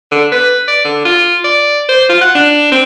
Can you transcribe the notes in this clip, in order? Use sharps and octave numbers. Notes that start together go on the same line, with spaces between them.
D3
B4
D5
D3
F4
D5
C5
F4
F#5
D4
C4